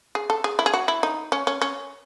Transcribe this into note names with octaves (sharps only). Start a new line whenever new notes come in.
G#4
A4
G#4
E4
G#4
F#4
E4
D#4
C#4
C#4
C#4